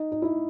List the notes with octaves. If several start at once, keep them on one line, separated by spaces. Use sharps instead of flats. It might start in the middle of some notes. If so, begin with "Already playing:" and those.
Already playing: D#4
D#4
E4